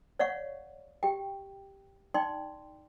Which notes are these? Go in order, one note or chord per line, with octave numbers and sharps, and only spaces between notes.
C#5 D5 F5 F#5 C#6
G4 G5
D#4 D5 G5 C6